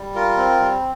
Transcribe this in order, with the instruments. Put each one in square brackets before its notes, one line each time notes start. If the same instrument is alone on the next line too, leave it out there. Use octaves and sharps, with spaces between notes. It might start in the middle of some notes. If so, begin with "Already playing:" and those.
Already playing: [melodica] G3
F4 A#4
C4
G3